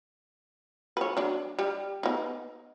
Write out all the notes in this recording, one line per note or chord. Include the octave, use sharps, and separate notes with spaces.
B4 C#5
F#3 D4
G3
B3 D#4